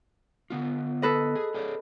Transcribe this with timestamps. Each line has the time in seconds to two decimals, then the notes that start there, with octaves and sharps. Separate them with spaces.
0.50 D3 B3 F4
1.02 A4 B4 D#5
1.35 G#4
1.54 G#4 C#5 D5